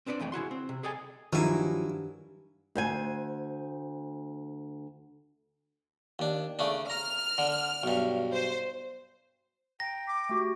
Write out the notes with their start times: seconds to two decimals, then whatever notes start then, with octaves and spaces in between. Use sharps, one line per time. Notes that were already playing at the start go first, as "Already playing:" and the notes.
0.06 C4 D4 B4 C#5 D5
0.20 F2 E3 A3 G5
0.32 C#3 E4 F#4 C6
0.51 C4
0.69 C3
0.83 G#4 A4 D5 D#5 G5 G#5
1.33 G2 D#3 F3 F#3 A#3 E4 G#5
2.75 D2 C5 G#5
6.19 D#2 D4
6.59 C#3 A3 D4
6.90 A#5 F6
7.38 D3
7.83 B1 G2
8.33 C5
9.80 G5 A#5 A#6
10.08 D6 B6
10.29 A3 F#4 G4